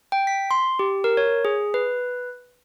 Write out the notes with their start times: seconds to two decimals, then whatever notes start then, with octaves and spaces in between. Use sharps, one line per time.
0.12 G5
0.27 B6
0.51 C6
0.79 G4
1.04 A#4
1.17 C#5
1.45 G#4
1.74 B4